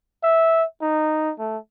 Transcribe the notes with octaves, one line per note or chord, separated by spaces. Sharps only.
E5
D#4
A3